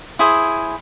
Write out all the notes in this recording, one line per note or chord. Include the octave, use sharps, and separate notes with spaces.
E4 G#4 C5